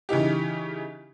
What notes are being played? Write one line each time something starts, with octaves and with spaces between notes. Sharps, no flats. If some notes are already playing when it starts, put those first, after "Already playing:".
C#3 E3 D#4 G4